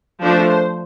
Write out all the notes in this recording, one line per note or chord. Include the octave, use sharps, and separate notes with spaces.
F3 A3 D4 C5